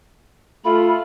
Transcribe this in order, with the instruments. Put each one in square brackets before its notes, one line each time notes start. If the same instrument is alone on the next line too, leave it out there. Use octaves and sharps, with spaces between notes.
[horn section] A3 F4 [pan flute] B5